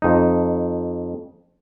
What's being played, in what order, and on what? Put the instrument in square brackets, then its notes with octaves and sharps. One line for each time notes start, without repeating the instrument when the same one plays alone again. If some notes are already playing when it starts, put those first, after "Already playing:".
[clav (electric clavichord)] F2 D#4